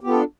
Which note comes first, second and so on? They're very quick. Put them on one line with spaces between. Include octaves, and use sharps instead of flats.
G4 B3 F4 A4 D4